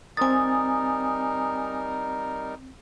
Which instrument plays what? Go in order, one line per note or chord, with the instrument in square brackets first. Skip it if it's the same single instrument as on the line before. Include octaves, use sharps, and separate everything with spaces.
[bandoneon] G3 D#4 A#4 [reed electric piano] C4 A6 [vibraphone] G#5 D#6